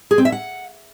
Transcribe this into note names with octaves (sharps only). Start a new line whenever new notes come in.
G#4
C4
E5
F#5